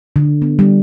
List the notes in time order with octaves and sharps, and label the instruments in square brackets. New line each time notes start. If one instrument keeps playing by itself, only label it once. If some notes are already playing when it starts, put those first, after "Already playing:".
[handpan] D3
B3
G3